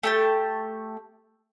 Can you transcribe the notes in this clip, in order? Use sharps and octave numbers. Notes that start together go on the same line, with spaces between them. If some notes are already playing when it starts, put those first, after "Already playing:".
A3 G4 A5